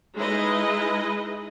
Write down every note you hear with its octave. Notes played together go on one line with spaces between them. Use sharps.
G#3 D#4 E4 G#4 B4 D#5